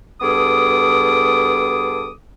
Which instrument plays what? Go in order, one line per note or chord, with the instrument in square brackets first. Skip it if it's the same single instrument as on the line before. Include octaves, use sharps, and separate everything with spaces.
[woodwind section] G2 B3 G#4 A4 D6 D#6